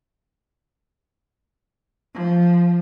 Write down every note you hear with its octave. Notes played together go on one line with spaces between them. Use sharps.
F3